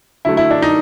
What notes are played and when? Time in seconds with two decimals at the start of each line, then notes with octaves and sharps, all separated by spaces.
0.25 D3 F#3 A3 E4
0.37 E4
0.51 D4
0.62 D#4